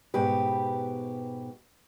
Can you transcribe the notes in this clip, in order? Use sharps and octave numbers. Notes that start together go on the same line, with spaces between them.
G#2 B2 G4 B4